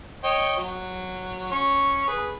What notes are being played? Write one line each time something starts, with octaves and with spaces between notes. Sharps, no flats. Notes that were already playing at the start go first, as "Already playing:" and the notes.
C#5 D#5 G5
F#3
C#4 C#6
G#4 B4